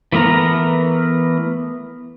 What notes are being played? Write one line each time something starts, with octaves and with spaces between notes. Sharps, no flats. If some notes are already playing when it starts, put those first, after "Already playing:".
E3 A3 B3 A#4 A#5